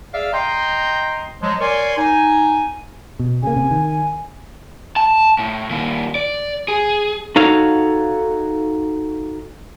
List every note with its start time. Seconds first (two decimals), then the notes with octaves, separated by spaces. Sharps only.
0.14 G#4 D5 E5 F5
0.33 D#5 G5 A#5 C6
1.42 F3 F#3 G#3
1.60 A#4 C#5 D5 G#5 C6
1.98 D#4 G#5
3.19 B2
3.43 C#3 A#3 G#5
3.56 C3
3.71 D#3
4.96 A5
5.39 A2
5.70 D#2 A#2
6.15 D5
6.68 G#4
7.36 D#4 F#4 A4 C#5 F5